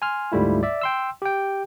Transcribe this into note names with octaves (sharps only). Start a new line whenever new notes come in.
G#5 C6 F6
D2 G#2 G3 A3 E4 F4
D5 E5
G5 C6 E6
G4 G5